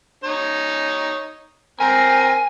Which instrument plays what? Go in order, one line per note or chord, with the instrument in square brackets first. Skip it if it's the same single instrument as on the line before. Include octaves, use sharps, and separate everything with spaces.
[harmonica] D#4 C#5
[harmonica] C4 A#4 A#5 [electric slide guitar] G#5